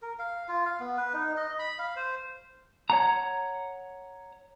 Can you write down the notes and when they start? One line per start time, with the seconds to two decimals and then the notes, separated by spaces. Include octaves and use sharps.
0.02 A#4
0.19 F5
0.48 F4
0.65 F5
0.80 B3
0.97 B4
1.13 D#4
1.37 D#5
1.59 B5
1.79 F5
1.96 C5
2.90 C#5 F#5 A#5